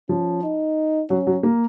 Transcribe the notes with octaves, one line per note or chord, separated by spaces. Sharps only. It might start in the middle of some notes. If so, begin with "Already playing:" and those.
F3 C#4
D#4
F#3 C#4
F#3
A#3